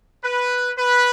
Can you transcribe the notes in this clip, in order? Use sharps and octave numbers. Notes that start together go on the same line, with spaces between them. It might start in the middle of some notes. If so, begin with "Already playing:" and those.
B4
B4